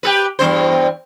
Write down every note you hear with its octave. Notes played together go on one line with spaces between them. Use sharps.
G4 A4 B4
E2 G2 C5